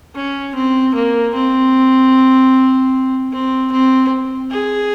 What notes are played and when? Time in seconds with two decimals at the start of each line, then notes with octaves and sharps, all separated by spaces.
0.15 C#4
0.55 C4
0.94 A#3
1.35 C4
3.33 C4
3.72 C4
4.51 G#4